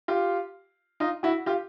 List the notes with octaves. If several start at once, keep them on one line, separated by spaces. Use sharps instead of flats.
F4 G4
D#4 F4
E4 F#4
F4 G4